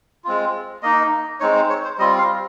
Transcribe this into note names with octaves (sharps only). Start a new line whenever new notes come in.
G#3 C4 F4
A#3 D#4 D#5
G#3 C4 D#4 C#5
C5
C#5
C5
G3 C4 F4 D#5
F5